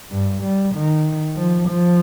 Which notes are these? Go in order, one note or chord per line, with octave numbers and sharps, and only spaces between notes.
G2
G3
D#3
F3
F3